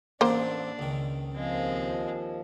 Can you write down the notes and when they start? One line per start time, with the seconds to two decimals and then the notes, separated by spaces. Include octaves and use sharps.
0.21 A1 E2 A#3 C4 D4 C5
0.79 C#2 D#3
1.34 D#2 F3 G#3 C4